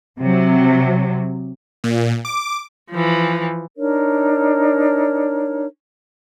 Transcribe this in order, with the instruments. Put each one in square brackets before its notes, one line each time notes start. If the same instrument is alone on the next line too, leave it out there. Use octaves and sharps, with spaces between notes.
[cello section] C3 F#3
[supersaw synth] A#2
D6
[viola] E3 F3
[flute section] D4 D#4 A#4 C#5